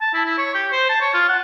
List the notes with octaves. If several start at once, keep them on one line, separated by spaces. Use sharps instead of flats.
A5
E4
E4
C#5
G4
C5
A5
C#5
F4
F#5